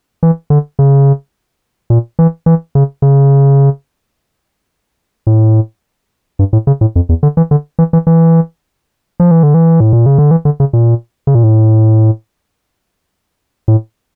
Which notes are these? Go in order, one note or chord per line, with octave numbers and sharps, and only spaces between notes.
E3
D3
C#3
A#2
E3
E3
C#3
C#3
A2
G2
A2
C#3
A2
F2
E2
D3
E3
D3
E3
E3
E3
F3
E3
D3
E3
A2
A#2
C#3
D3
E3
D3
C#3
A#2
C#3
A#2
A2
A2